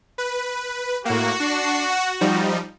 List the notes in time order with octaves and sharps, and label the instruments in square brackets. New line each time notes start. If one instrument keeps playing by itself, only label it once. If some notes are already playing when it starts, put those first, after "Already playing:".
[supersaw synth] B4
[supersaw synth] A2 A#3 [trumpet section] F#4
[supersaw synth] D4 C7
F#5
F3 G3 D#4